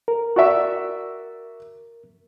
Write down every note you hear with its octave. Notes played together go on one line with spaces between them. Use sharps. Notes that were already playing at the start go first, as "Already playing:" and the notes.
A#4
F#4 D5 E5